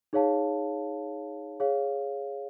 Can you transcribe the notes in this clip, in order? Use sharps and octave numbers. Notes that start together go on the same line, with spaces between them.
D#4 G#4 C#5 F5 A5
G#4 C#5 F5